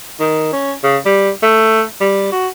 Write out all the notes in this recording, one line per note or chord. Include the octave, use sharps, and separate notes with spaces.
D#3
C#4
C#3
G3
A3
G3
F#4